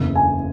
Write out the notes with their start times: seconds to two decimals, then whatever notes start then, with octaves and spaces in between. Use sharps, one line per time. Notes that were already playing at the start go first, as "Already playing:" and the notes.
Already playing: F#1 E2 C#3
0.16 G#5